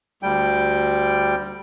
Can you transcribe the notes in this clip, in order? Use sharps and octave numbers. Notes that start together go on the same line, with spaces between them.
D2 G3 G5